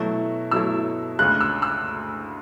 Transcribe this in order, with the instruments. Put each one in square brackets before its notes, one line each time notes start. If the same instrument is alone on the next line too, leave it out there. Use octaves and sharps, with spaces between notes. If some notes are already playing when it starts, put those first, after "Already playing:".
Already playing: [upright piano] B2 F#3 A3 E4
B2 F#3 A3 E4 E6
D2 C#3 G#3 F#6
E6
E6